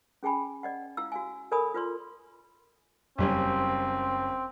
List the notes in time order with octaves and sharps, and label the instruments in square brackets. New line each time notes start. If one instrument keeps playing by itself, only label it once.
[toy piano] C#4 G#4 G5 G#5 B5
D5 D#5 F#5
E4 F5 E6
F#4 F5 G#5
A4 A#4 D5 G#5 B5 D#6
F4 B4 D5 C6
[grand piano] F#1 G3 C#4 [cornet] C4